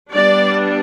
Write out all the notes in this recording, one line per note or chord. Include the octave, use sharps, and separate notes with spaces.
G3 B3 D4 D5